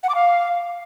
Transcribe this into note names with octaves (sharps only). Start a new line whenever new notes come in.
F#5
D6
F5